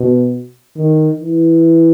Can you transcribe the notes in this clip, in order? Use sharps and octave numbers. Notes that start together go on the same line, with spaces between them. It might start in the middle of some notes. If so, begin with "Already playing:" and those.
Already playing: B2
D#3
E3